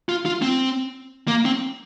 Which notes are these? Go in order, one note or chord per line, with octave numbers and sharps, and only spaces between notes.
F4
F4
C4
A#3
C4